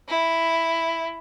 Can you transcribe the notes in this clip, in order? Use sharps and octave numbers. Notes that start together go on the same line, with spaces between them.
E4